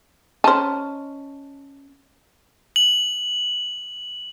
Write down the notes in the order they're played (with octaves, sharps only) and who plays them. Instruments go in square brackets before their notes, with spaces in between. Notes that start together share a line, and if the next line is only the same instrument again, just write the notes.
[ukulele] C#4 A5 [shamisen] D#4 C5
[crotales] F#7